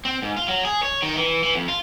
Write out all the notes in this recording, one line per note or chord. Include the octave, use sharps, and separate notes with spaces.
C4
G#2
F4
F#3
G#4
C#5
D#3
E3
E3
F2
F4